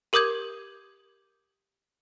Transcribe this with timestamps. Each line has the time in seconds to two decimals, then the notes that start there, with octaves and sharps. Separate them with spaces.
0.13 G4 A#4 D6 D#6 G6 G#6